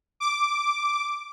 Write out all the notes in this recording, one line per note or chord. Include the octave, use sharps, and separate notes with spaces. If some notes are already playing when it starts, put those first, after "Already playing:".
D6